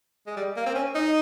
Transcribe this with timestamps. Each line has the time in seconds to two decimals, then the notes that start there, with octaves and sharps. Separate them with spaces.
0.27 G#3
0.36 G3
0.56 A#3
0.66 C4
0.75 C#4
0.95 D#4